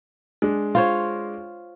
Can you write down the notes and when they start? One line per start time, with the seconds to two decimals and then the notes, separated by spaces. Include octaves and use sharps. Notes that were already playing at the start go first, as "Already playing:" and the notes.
0.42 G#3 D4
0.75 F4 C5 C#5